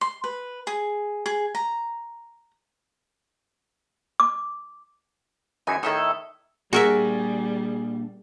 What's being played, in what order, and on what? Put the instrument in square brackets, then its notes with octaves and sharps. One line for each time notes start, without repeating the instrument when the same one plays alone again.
[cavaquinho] C6
B4
G#4
G#4
A#5
[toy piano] D6
[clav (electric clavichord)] F#2 E3 D#4 [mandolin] G#5
[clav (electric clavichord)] A2 D#3 [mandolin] D#4 E4 A4
[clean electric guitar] A#2 D4 [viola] G3 [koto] F#4 A#4 E5 [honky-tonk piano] G#4